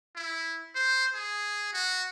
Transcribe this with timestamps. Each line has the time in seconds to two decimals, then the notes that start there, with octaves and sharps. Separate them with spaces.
0.15 E4
0.75 C5
1.15 G#4
1.73 F#4